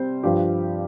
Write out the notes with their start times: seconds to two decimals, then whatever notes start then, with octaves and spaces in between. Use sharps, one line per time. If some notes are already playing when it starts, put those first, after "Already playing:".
Already playing: C3 G3 C5
0.23 G2 F3 G4